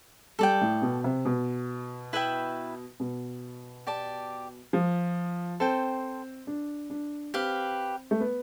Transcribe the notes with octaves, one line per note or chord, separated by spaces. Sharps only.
G3 A4 D5 G5
A2
B2
C3
B2
E4 B4 E5 G5
B2
G4 D5 A5
F3
C4 A4 C5 G5
D4
D4
C4 G4 B4 F5
A3
B3